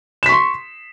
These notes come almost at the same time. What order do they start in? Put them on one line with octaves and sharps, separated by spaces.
E7 B6 C#6 C6